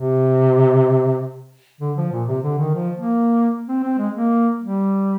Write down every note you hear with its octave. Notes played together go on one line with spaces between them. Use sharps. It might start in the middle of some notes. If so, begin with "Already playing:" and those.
Already playing: C3
D3
F3
A#2
C3
D3
D#3
F3
A#3
C4
C4
G#3
A#3
G3